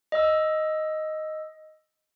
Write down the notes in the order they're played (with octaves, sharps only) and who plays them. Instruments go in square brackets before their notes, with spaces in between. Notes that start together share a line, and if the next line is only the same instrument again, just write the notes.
[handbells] D#5 E6